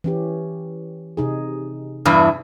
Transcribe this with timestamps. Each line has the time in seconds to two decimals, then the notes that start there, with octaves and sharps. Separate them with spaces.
0.04 E3 C#4 G4
1.17 C3 D#4 G#4
2.05 E2 G2 E3